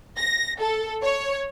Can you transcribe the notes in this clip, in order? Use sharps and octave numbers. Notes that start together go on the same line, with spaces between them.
A#6
A4
C#5